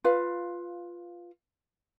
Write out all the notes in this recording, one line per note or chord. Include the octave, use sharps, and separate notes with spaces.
F4 B4 F5